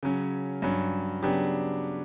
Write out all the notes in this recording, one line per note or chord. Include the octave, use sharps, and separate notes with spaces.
C#3 F#3 C#4
G2 F#3 C#4
C#3 F#3 B3 D4 G4